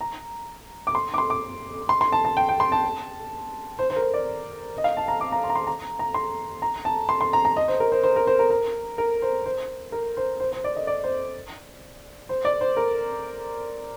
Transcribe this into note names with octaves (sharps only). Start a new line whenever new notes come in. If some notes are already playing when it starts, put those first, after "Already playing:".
A#5
D6
C6
D6
C6
D6
C6
C6
A5
A5
G5
G5
C6
A5
C5
C5
A#4
C5
D5
D#5
F5
A5
A#5
D6
A#5
C6
A#5
C6
A#5
A#5
C6
A#5
A5
C6
C6
A#5
A#5
D#5
C5
A#4
C5
C5
A#4
C5
A#4
A#4
A#4
C5
C5
A#4
C5
C5
C5
D5
D#5
D5
C5
C5
D5
C5
A#4